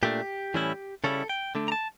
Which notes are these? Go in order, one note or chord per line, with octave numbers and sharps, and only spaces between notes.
A#2 A3 D4 G4
A2 E3 G3 C#4 E4
C#3 G3 C#4 E4 A4
G5
D3 A3 D4
A#5
A5